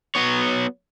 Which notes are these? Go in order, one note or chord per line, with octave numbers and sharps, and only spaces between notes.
F#3 B3 C#5